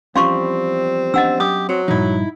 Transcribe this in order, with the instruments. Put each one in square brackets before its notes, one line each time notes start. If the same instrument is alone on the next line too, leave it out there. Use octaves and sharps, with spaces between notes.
[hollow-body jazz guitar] E2 F3 G3 [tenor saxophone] C4 [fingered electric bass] C#4 [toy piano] F5 C6 C#6
[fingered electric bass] B3 C#4 D4 [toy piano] D#5 F#5 E6
[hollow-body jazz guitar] F#2 [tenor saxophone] G4 [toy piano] D#6
[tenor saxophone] F#3 [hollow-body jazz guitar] C4
[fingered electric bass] G2 A#2 F3 [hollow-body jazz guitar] D#4 E4